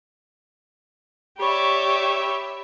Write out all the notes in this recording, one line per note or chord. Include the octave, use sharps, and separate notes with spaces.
G4 C#5 D5 E5 B5 C#6